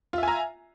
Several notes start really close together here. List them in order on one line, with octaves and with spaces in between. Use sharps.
F4 E5 G#5 A#5